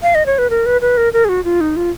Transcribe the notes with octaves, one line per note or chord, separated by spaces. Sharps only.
F5
D#5
C#5
B4
A#4
B4
B4
A#4
A#4
G#4
F#4
F4
D#4
F4